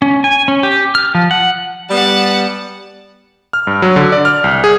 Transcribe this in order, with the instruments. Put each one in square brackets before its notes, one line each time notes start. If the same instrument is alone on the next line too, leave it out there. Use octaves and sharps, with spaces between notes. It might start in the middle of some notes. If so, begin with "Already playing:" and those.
[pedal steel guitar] C#4
G#5
C#4
G4
F6
F3
F#5
[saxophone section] G3 B3 [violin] F#5 A5
[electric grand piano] F6
G2
F#3
D3
D5
F6
C2
G#4